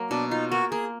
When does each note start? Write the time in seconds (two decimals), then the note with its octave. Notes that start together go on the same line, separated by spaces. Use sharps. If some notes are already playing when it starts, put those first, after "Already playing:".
Already playing: F#3 A#3
0.10 B2 D4
0.31 D#4 F4
0.51 A#3 F#4
0.71 A#3 G#4